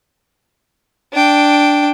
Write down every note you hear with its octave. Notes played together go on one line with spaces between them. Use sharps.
D4 G5